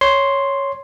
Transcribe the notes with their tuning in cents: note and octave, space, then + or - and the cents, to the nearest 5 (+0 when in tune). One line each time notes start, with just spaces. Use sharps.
C#5 +0 C6 +0